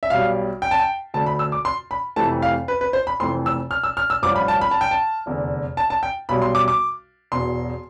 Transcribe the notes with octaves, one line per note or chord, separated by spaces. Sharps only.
E5
B1 B2 G3 F5
G5
A5
G5
D2 D3 A3 A5
B5
E6
D6
C6
B5
F1 F2 C3 E3 A3 A5
F5
B4
B4
C5
B5
F1 F2 E3 A3 C6
E6
F6
E6
F6
E6
A1 G2 F3 D6
B5
A5
B5
A5
G5
A5
F1 E2 D3
A5
A5
G5
B1 B2 G3 B5
C6
D6
D6
E1 E2 B2 C6